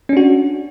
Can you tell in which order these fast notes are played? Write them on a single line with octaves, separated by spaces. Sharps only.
C#4 D4 F#4